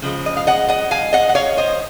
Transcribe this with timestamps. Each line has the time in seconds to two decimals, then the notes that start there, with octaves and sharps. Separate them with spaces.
0.02 C#3 F3 G#3
0.26 D#5
0.37 F5
0.47 D#5 F#5
0.69 D#5 F#5
0.91 F5 G#5
1.13 D#5 F#5
1.29 F#5
1.35 C#5 F5
1.57 C5 D#5